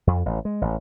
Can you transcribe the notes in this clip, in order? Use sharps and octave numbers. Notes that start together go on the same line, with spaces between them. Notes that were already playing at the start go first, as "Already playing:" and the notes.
F2
A1
G#3
A1